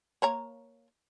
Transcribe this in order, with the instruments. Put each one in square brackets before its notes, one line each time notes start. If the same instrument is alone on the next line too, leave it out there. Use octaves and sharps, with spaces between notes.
[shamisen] A#3 C#5 A#5